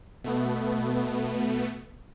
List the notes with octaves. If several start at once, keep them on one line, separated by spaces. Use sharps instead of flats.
B2 A3 B3